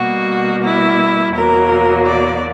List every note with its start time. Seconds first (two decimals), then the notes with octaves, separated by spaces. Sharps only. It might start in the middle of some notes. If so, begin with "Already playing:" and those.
Already playing: B2 G3 A#3 F#4
0.63 E4
1.34 E2 B2 F#3 A#3 A#4
2.05 D5